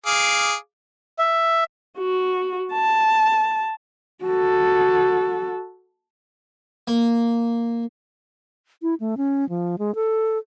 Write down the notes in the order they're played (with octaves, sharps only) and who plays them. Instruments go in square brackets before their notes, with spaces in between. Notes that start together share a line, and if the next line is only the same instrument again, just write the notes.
[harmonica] G#4 F5 D6
[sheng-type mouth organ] E5
[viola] F#4
A5
[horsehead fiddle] F#4 A4
[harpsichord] A#3
[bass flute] E4
A3
C#4
F3
G#3
A4